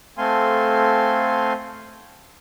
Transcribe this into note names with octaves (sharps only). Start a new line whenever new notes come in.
A3 C4 A4 F5 G#5 C6